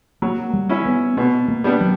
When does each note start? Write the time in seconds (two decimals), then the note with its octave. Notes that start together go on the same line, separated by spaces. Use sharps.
0.22 F#3 A#3
0.53 G3
0.69 C#4 E4
0.86 B3
1.17 B2 B3
1.48 A#3
1.64 G3 B3 D4
1.80 F#3